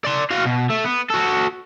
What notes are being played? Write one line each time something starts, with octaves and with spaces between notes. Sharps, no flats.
D5 C6
F#4 F5
B2
A3
B3
F#4 A4